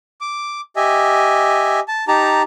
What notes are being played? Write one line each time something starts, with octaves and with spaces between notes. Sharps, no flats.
D6
G4 D#5 E5 G#5
A5
D#4 G4 A5 A#5